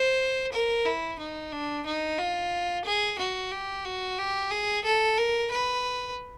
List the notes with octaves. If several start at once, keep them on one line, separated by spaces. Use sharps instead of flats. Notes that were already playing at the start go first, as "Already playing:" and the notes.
Already playing: C5
A#4
E4
D#4
D4
D#4
F4
G#4
F#4
G4
F#4
G4
G#4
A4
A#4
B4